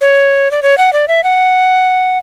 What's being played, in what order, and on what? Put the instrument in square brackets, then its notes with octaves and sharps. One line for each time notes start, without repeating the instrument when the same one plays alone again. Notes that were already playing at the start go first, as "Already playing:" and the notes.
[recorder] C#5
D5
C#5
F#5
D5
E5
F#5